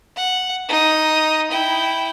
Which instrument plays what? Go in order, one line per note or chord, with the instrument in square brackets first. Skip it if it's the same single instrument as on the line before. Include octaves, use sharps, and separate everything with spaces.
[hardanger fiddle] F#5
D#4 D#6
E4 G5